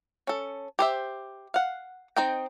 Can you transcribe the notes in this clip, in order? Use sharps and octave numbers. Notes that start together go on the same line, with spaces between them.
C#4 A4
G4 C5 E5
F5 F#5
C4 D#4 C5 D#5 G5